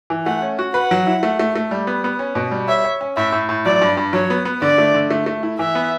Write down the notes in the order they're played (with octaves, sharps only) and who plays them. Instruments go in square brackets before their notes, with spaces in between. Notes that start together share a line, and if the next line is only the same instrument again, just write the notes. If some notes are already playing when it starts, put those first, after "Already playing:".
[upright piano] E3
[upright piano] A3 [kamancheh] F#5
[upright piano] C#4
F#4
[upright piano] B4 [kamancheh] F#5
[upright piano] F#3
E4
A3
A3
A3
G3
B3
B3
C#4
B2
G3
[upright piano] C#5 [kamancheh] E5
[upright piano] C#5
C#4
[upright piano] A2 [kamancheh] E5
[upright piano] A2
A2
[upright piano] F#3 [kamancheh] D5
[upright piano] G2
G2
[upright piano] F#3 [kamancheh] C#5
[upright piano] B3
B3
[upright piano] D3 [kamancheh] D5
[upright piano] A3
D3
A3
A3
E4
[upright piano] E3 [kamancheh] E5
[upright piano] B3